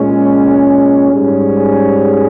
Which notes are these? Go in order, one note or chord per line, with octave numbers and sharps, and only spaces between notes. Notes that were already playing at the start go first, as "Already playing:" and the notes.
Already playing: A#2 G#3 C#4
G#2 G3 C#4 G#4